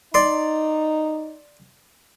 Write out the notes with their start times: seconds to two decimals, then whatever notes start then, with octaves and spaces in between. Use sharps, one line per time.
0.14 D#4 D5 C6